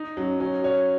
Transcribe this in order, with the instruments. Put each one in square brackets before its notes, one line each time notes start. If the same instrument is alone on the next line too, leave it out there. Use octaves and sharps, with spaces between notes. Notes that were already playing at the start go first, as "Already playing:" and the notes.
Already playing: [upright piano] D#4
[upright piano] F#3 [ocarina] C#4
[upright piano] C#4 [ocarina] F#4
[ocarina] F#4 [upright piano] C#5